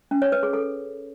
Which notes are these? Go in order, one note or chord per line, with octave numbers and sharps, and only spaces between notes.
C#4
C#5
B4
G#4
A4